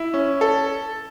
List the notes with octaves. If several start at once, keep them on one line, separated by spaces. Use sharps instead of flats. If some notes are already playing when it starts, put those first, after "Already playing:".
Already playing: E4
C#4
A4